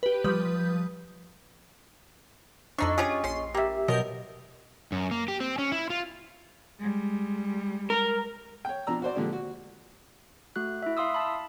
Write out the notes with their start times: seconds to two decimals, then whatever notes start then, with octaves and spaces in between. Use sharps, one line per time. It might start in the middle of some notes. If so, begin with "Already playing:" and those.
0.03 G4 B4
0.24 F3 G3 B4 D#6 G6
2.78 F2 C4 D4 D#4 A4 D#5 C#6
2.98 C#4 F4 G4 G#4
3.24 A#1 C#4 C6 C7
3.55 G3 A#3 G4 E5
3.88 B2 F#3 A#4 D#5 G6
4.92 F#2
5.11 A#3
5.28 G4
5.40 C4
5.58 C#4
5.72 E4
5.90 F4
6.79 G3 G#3
7.90 A#4
8.65 C#5 G5
8.87 B2 F3 D4 A#5 E6
9.02 F#4 C5 D5
9.15 A#2 D3 F3 G#3 D4 G4
9.33 F#4
10.56 A3 F#4 F#6
10.82 E4 E5
10.97 E5 F5 C6 D#6 E6
11.14 A5 B5